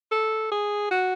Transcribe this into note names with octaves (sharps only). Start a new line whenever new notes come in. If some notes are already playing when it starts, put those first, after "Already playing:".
A4
G#4
F#4